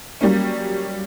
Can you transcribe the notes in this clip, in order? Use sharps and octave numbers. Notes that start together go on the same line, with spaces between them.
F#3 G3 A#3 C#4